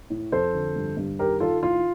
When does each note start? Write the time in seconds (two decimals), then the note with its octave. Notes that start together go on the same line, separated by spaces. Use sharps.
0.10 A2
0.32 F2 A4 C5
0.54 D3
0.76 G2
0.97 G2
1.19 D#3 G4 A#4
1.40 D#3 F4 A4
1.63 A2 F4